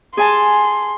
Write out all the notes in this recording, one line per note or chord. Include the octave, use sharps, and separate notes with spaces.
G#4 G#5 A5 C6